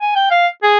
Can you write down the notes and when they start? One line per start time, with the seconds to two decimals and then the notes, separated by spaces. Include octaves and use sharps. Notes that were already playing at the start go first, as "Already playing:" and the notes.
0.01 G#5
0.16 G5
0.31 F5
0.63 G#4